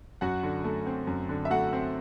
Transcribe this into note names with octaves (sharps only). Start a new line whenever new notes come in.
F#2 F#4 F#5
D3
A3
C4
F#2
D3
E5
A3 F#4 F#5
C4